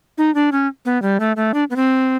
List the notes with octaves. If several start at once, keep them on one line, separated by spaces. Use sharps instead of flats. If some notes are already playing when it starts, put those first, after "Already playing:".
D#4
D4
C#4
B3
G3
A3
A3
D4
B3
C4